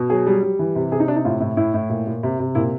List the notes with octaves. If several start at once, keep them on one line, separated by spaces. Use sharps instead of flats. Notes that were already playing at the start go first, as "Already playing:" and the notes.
Already playing: B2
F#3 G#4
G3
G3
E3
C3
C3 G#4
D#4
C3 D4
D#4
A2 F4
A2 E4
A2 E4
A2
A#2
A#2
C3
C3
A#2 E4